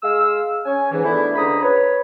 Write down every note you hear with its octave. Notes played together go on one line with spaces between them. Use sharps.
G#3 F5 E6
C#4 G#5
G#2 E3
A3 B3 D4 E4
C#2 D3 C5 A#5 B5 D#6
B4 C#5